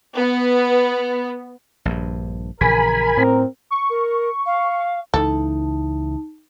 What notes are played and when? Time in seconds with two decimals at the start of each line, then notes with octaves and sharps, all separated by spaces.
0.17 B3
1.85 A#1 G2
2.61 A#1 C#3 E3 A#4 G#5 B5
3.17 A2 C4
3.71 C#6
3.89 A#4 C#6
4.46 F5
5.14 C#2 E3 D#4 A4 A5